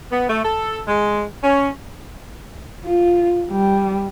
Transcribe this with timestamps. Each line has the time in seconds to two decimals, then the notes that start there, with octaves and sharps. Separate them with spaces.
0.12 B3
0.30 A3
0.45 A4
0.88 G#3
1.43 C#4
2.85 F4
3.52 G3